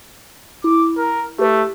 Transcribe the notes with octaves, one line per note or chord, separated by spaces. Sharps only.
E4 D6
A#4
A3 G4 B4